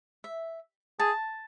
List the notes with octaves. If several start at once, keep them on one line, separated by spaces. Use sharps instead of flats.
E5
G#4 A5